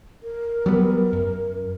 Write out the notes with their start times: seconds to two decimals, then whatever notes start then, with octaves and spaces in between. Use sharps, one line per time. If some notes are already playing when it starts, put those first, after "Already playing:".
0.23 A#4
0.66 F#3 G3 B3
1.13 F#2